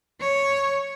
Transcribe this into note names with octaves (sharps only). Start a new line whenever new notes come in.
C#5